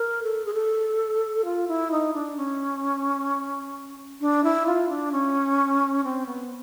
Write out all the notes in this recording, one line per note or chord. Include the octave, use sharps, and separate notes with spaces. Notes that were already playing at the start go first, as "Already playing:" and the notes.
Already playing: A#4
A4
G#4
A4
F4
E4
D#4
D4
C#4
D4
E4
F4
D4
C#4
C4
B3